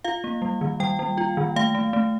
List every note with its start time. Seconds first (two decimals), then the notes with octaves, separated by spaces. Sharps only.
0.04 F4 F5
0.24 A#3
0.42 G3
0.61 D#3
0.80 G3 G5
0.99 G3
1.18 F4
1.37 D#3
1.56 A3 F5
1.75 A3
1.93 A3